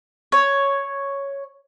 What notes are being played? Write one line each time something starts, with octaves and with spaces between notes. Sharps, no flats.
C#5